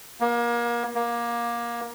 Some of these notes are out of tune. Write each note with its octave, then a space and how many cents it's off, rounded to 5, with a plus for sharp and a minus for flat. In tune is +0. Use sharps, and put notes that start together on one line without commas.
A#3 +30
A#3 +20